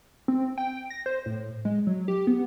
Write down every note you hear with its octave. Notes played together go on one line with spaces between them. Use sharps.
C4
G5
A#6
C5
A2
G#3
F#3
G4
B3